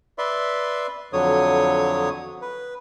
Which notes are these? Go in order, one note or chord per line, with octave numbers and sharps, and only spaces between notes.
B4 D5 E5 C6
F2 D3 F#3 C#5 D#6
B4